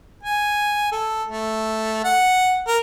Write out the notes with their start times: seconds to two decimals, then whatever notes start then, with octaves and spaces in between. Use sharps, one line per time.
0.23 G#5
0.92 A4
1.29 A3
2.04 F#5
2.67 A#4